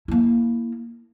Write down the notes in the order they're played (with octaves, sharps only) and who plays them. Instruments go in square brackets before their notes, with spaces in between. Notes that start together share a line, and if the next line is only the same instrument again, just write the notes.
[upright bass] A#3 E4